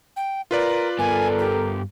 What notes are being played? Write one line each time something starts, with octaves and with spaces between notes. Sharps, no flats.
G5
F4 A#4 B4 D5
G2 B3 A4 A#4 G#5
G4